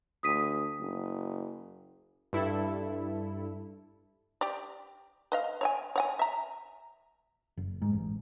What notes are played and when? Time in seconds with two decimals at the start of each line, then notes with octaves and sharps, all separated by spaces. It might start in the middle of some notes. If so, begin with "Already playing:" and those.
0.23 D2 D#6 B6 D#7
0.79 F#1
2.33 G2 E4 A4
4.41 G4 D5
5.32 B4 D#5 F5
5.61 C#5 E5 G#5
5.96 C#5 F#5 G#5
6.19 E5 A#5
7.57 F#1
7.82 G#2
7.93 A1